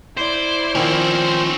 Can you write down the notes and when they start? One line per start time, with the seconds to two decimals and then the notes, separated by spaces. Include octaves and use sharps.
0.17 E4 C5 D5
0.75 D#3 F3 C4 C#4